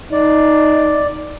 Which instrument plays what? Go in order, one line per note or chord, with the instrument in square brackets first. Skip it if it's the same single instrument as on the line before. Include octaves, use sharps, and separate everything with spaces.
[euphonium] D#4 [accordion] D5